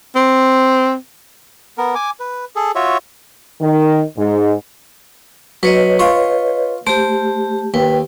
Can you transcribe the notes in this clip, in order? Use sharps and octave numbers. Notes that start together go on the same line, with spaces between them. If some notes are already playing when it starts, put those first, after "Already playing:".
C4
B3 A#4
G#5 D6
B4
G#4 A4
F4 F#4 C#5 E5
D#3
G#2
F#3 B4 C#5 D#5
F4 C6 C#6
A3 G4 C5
D#2 B4 G5